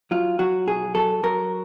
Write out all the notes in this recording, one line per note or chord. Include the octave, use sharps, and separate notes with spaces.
F#3 F4
F#3 F#4
B1 G#4
F#3 A4
F#3 A#4